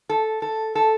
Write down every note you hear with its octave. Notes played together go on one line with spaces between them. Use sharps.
A4
A4
A4